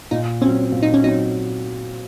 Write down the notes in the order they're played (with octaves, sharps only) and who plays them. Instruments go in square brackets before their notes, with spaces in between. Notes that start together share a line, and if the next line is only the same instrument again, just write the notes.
[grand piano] A#2 [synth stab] D#4
[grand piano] F#3 C4 [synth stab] C#4
[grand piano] A#2
[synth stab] D#4
C#4
[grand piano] F#3 C4 [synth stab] D#4